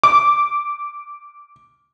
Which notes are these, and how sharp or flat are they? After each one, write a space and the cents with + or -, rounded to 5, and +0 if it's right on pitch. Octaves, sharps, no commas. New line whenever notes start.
D6 -10